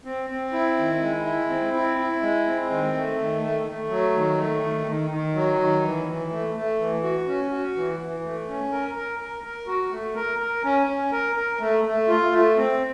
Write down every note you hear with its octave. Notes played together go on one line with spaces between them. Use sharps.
C4
C4
E4
D#3
G#3
E4
C4
E4
E4
G#3
C4
D#3
A3
D#3
A3
A3
F#3
D#3
A3
D#3
D#3
D#3
F#3
D#3
E3
E3
A3
A3
E3
F#4
C#4
F#4
E3
E3
A3
C#4
A#4
A#4
A#4
A#4
F#4
A3
A#4
A#4
C#4
C#4
A#4
A#4
A3
A3
F4
A3
C4